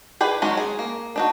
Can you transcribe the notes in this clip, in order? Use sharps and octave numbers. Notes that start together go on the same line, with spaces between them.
G#4 B4 D5 G5
D#3 F#3 G#3 C#4 F#4
G#4
A#3
D4 D#4 F#4